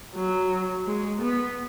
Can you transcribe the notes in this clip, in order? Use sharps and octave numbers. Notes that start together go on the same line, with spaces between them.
F#3
G#3
B3